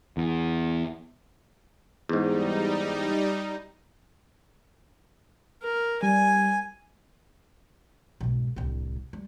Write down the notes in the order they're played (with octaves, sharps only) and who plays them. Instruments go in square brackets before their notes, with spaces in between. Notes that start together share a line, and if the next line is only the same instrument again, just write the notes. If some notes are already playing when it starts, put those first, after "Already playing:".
[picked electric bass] E2
[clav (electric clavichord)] E2 G#2 [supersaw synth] G3 D#4
[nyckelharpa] A#4
[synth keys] G3 [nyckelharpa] G#5
[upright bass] B1 G#2
D1 C2
G3